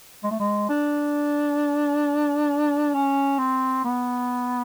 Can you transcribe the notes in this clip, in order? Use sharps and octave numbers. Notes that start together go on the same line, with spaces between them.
G#3
A3
G#3
D4
C#4
C4
B3